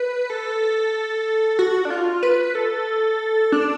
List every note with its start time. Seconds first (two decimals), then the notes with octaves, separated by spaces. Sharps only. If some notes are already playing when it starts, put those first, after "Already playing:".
Already playing: B4
0.30 A4
1.59 F#4
1.85 D4
1.90 F4
2.23 B4
2.55 A4
3.52 D4